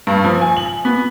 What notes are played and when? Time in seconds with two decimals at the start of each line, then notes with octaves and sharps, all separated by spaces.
0.07 G2
0.24 F3
0.41 G#5
0.57 F#7
0.85 B3